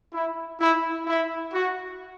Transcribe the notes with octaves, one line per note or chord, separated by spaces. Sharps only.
E4
E4
E4
F#4